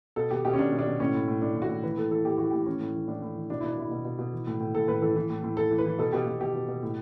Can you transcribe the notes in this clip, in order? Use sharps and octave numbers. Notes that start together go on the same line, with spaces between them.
B2 A4
B2 G4
B2 G4
C#4
B2 D4
B2
D4
B2
A2 C#4
A2
A2
A2 D4
A2
F#4
A2
E3 B4
A2 A4
E3 A4
A2 G4
E3 F#4
A2 G4
E3 C#4
A2
E3
A2 D4
A2
E3
B2 D4
B2 E4
D4
B2 E4
B2
B2
B2
E3
A2
A2
A2 A4
A2 B4
E3 A4
E3
A2
A2
E3 A4
E3
B4
E3
B2 A4
B2 G4
B2
B2 G4
B2
B2
A2